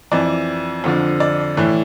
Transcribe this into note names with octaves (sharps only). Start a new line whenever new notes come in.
F2 E3 D5
F2 D3 F3
D5
A2 E3